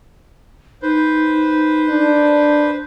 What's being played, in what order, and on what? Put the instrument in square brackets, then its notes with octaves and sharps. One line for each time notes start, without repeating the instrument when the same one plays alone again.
[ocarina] D#4 [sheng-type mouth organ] B4 C5
[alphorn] D4